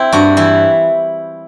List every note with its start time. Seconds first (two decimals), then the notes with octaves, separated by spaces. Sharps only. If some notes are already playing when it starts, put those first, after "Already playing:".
Already playing: C4 E4
0.12 G2 F#4
0.37 E3 E4